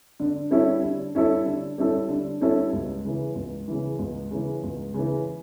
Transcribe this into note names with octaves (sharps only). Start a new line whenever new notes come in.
D3
G3 C#4 E4 A4
D3
G3 C#4 E4 A4
D3
G3 C#4 E4 A4
D3
G3 C#4 E4 A4
C#2
C#3 E3
C#2
C#3 E3
C#2
C#3 E3
C#2
C#3 E3